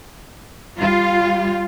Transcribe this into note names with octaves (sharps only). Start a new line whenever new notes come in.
G3 F4